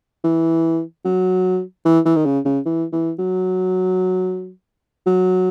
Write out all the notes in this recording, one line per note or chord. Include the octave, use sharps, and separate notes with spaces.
E3
F#3
E3
E3
D#3
C#3
C#3
E3
E3
F#3
F#3